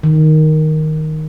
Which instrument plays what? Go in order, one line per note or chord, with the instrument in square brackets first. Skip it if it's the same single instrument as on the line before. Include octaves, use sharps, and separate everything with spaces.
[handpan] D#3